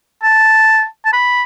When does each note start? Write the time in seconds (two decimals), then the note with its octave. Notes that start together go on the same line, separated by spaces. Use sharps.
0.23 A5
1.05 A5
1.13 B5